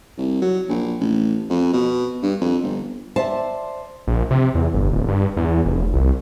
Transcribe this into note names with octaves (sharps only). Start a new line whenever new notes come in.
C2
F#3
A#1
A1
F2
B2
G2
F2
G1
C5 D5 E5 A5
A#1
C3
E2
G1
D1
G2
E2
F1
C2